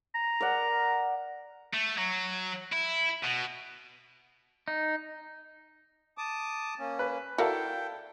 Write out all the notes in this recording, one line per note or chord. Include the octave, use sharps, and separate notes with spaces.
A#5
A#4 D5 F#5
A3
F#3
E4
B2
D#4
A5 D6 D#6
A#3 C#4
B4
E4 F#4 A4 A#4 D5 F5 G5